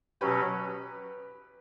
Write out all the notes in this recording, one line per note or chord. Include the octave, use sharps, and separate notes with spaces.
B2 F#3 C#4 G4 B4